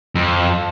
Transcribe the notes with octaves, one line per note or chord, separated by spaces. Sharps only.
F2